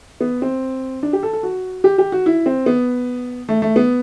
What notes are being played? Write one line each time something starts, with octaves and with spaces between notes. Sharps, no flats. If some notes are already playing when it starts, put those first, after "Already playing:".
B3
C4
D4
G4
A4
A4
F#4
G4
G4
F#4
E4
C4
B3
A3
A3
B3